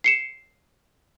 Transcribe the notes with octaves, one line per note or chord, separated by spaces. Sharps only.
C7 C#7 E7